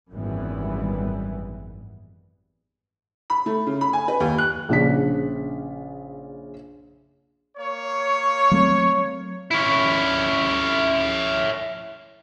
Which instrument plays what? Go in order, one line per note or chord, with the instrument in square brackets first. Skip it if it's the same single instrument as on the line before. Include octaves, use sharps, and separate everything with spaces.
[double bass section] G#1 F#2 E3 G3 B3
[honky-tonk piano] B5
A3
C#3
B5
G#5
B4
D#2
F#6
[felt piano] A#1 C#3 D4 B6
[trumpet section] A#3 C#5
[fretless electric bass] F#3 A3 C4
[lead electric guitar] C#4 E4